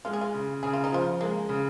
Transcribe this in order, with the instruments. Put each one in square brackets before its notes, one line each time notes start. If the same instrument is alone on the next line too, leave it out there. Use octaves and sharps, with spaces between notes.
[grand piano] G#3 [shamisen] F4
[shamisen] G#4
F4
[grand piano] C#3
[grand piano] C#3 [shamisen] G#4
[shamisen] F4
D#4
[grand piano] F3 [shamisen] F4
[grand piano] G#3 [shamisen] A#3
[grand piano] C#3